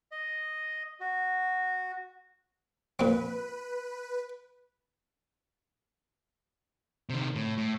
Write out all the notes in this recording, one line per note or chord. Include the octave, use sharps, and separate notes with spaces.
D#5
F#4
A#2 C4 B4
C3 D#3
A2
A2